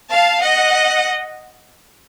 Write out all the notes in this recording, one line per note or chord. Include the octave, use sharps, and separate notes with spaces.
F5 A5
D#5 F#5